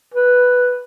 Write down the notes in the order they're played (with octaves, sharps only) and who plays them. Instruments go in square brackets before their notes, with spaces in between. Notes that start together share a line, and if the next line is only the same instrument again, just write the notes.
[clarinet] B4